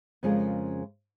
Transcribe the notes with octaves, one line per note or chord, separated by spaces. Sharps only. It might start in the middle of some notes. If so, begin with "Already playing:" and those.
F2 C#3 G#3 C#4 F4 A#4